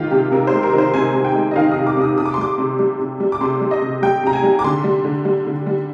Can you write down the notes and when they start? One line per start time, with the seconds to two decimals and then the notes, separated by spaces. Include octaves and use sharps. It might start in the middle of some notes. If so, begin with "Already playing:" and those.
Already playing: D#3 G#3 F4 G4
0.11 C3 G4
0.32 C3 A#4
0.47 G#3 C5
0.63 A#4
0.73 D#3
0.78 C5
0.94 C3 G#5
1.14 C3
1.25 G5
1.35 G#3
1.51 D#5
1.56 D#3 F5
1.71 D#6
1.77 C3
1.87 D6
1.97 C3 D#6
2.17 C3 D#6
2.26 D6
2.34 C6
2.38 G3 D6
2.58 C3
2.79 G3
2.99 C3
3.20 G3
3.32 D6
3.41 C3 C6
3.61 G3
3.71 D#5
3.82 C3
4.02 G3 G5
4.23 C3 A#5
4.33 G#5
4.43 G3
4.59 D6
4.64 D3 C6
4.84 G3
5.05 D3
5.25 G3
5.47 D3
5.66 G3